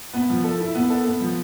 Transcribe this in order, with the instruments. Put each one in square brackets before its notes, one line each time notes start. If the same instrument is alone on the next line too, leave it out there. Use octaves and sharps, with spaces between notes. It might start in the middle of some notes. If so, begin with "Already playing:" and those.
[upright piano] B3
F3
A4
E4
B3
A4
B3
F3